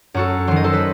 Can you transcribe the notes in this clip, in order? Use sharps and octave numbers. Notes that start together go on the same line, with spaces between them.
F#2 F#4 A4
D#3 F#3 C5
D#5
A4 C5
B4